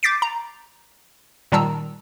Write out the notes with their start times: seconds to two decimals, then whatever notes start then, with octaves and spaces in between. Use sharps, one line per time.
0.03 D6 G6 A6 B6 C7 D7
0.22 A#5
1.52 A#2 D#3 G3 A5 A#5 E6